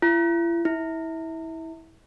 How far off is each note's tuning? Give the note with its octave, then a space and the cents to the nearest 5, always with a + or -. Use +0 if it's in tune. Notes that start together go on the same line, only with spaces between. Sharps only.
E4 +40
E4 -25